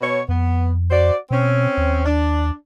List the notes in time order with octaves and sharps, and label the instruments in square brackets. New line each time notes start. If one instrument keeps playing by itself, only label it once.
[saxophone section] B2 C#5
[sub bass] F2 [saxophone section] B3
[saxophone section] F#4 C5 D5
[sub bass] B2 [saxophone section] C4 C#4
[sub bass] D#2
[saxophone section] D4